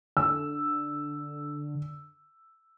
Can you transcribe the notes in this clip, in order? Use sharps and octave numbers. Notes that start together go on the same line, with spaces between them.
D3 E6